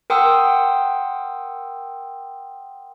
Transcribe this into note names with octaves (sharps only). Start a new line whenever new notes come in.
A#4 F#5 G5 C6 D#6 E6